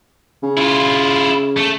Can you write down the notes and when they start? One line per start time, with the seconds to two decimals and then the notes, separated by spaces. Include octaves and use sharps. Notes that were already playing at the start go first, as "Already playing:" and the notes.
0.43 C#3
0.57 E4 F4
1.56 A3